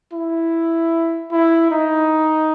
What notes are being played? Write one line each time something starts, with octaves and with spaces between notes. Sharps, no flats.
E4
E4
D#4